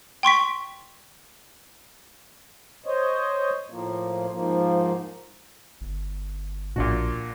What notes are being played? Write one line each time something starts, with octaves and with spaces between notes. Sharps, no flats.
G5 C6 C#6 B6
C5 C#5 D#5
A2 F3 A#3
G#2 F3 A#3
G1
A#1 A#2 D4 F#4